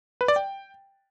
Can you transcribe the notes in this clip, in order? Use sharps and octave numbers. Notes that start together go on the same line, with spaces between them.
B4
D5
G5